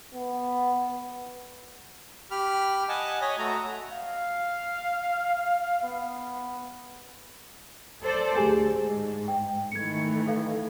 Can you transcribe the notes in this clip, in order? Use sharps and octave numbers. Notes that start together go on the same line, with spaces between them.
B3
G4 B5 F6
D#5 F#5 G#5 A5
C#5 D#5 G#5 B5 D#6
A3 F#4 A#5
F5
B3
A4 C5 D5
D2 G4 G#4 G#5
G#2 G#4
G5
D#3 E3 A3 G#6 C#7
A4 F5